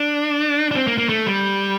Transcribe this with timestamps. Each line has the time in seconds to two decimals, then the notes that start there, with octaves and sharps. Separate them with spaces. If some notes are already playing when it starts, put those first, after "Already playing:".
Already playing: D4
0.71 D4
0.76 C4
0.87 A#3
0.98 A#3
1.09 A3
1.27 G3